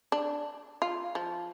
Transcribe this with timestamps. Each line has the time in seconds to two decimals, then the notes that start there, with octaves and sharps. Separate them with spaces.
0.12 D4
0.82 F4
1.15 F3